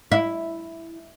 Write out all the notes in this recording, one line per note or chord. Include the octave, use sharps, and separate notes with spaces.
E4